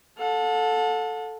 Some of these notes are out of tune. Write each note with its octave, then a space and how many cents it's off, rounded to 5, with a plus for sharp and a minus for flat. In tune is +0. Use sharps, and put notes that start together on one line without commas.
A4 +0 F#5 -45